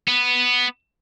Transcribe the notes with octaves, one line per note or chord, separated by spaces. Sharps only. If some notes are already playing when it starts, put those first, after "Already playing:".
B3